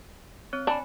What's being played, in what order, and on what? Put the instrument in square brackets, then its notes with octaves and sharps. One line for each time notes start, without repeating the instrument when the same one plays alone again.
[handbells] C4 C#5 F#6
[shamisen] D4 [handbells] G#5 B5